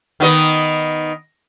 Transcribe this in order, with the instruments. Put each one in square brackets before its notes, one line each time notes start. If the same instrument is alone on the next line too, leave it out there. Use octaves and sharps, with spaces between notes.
[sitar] D#3 B3 D#5